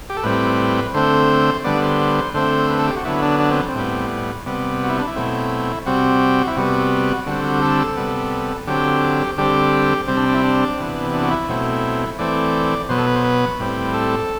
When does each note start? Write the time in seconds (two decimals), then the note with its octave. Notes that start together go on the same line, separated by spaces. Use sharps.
0.10 G4
0.17 A4
0.23 A2 G3 C4 B4
0.94 D3 A3 C4 C5
1.64 D3 G3 B3 D5
1.82 C5
2.34 D3 A3 C4 C5
2.70 B4
2.79 A4
2.87 G4
2.96 F#4
3.05 D3 F#3 B3 E4
3.22 D4
3.40 D4
3.50 C4
3.69 C4
3.75 A2 G3 B3
4.46 C3 G3 B3
4.84 F#4
4.90 E4
4.99 D4
5.08 E4
5.16 B2 F#3 A3 C4
5.86 C3 G3 C4 F#4
6.47 E4
6.56 C3 G3 B3 F#4
7.26 D3 G3 C4 F#4
7.44 F#4
7.62 A4
7.97 C3 G3 B3
8.67 D3 F#3 C4 G4
9.38 D3 G3 C4 G4
10.08 C3 G3 C4
10.17 D4
10.29 D4
10.34 E4
10.43 D4
10.78 C3 E3 B3
11.13 D4
11.23 F#4
11.31 E4
11.49 B2 F#3 A3 C4
12.19 E3 A3 C4 D5
12.89 B2 F#3 B3 C5
12.98 A4
13.07 B4
13.16 C5
13.24 B4
13.59 A2 G3 C4
13.94 A4